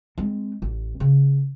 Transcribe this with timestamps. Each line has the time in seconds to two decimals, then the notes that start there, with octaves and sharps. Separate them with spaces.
0.18 G#3 C4
0.62 A1
1.00 C#3